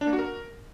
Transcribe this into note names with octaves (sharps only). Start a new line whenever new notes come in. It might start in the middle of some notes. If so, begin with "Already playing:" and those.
D4
A#3
F#4
A#4